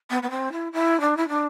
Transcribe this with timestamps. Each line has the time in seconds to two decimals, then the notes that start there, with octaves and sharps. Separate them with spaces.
0.10 B3
0.22 B3
0.30 C4
0.52 E4
0.72 E4
1.00 D4
1.17 E4
1.28 D4